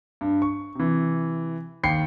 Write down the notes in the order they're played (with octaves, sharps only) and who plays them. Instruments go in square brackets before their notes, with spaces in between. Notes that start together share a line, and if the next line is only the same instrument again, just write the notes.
[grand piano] G2
C#6
C3 E3
D#2 G5 B5 C7 C#7